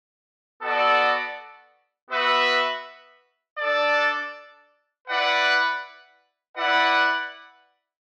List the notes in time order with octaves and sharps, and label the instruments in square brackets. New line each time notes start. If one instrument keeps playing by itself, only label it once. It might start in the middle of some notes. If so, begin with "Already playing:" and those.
[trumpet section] B3 F#4 A4 D5 F#5
B3 F#4 B4 E5
D4 A4 D5
E4 B4 D5 F#5
E4 B4 D5 F#5